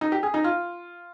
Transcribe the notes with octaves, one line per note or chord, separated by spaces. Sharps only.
D#4
G4
G#4
D#4
F4